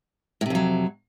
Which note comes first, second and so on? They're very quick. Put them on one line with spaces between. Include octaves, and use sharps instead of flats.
A2 C3 F2 F#3